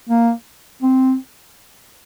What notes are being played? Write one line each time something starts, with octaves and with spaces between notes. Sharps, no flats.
A#3
C4